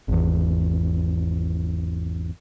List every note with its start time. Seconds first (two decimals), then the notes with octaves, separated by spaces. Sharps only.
0.08 G#1 E2